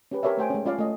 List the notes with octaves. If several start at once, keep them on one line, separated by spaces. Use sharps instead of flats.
C#4 G4 B4
G4 A#4 C#5 D5 E5
A3 C5 G5 G#5
G#3 C#4
C#4 F4 C#5 D5 F5
A3 D#5